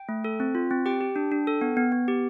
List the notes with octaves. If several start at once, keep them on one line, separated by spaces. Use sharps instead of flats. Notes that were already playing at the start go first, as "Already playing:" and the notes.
Already playing: G5
A3
A4
C4
F4
C4
G4 G5
G4
D4
D4
A4
B3
B3
B3
G4